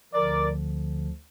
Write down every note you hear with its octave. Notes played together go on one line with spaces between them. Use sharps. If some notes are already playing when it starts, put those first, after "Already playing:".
D2 D3 F3 A#4 D5